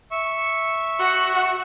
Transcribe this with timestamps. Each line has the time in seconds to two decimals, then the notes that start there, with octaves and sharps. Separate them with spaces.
0.11 E5 C#6
1.00 F#4